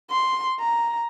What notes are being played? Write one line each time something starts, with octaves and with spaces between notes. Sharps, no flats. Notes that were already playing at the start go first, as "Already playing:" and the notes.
C6
A#5